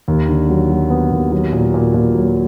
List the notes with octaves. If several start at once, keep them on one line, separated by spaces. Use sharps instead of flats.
D#2
D3
F#3
F#3
B3
D#2
F#3
A#2
A#2
A#2
F#3